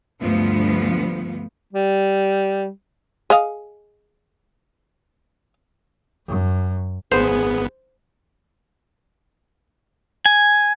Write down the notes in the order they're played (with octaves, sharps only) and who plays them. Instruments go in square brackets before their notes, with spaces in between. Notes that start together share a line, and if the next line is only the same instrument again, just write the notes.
[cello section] D2 G2 F3 B3
[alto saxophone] G3
[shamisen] G#4 D#5 F5
[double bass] F#2
[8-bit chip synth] G#1 B3 [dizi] G#4 [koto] C5
[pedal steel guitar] G#5